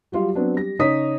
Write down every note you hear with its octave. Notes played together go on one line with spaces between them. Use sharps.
F#3 G3 F4
F#3 B3 C4 D4
G3 A#6
C#3 D#4 C#5 D#6 B6